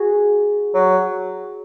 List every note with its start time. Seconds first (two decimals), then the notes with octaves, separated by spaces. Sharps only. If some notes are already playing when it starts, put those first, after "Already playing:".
Already playing: F#4 G#4
0.74 F#3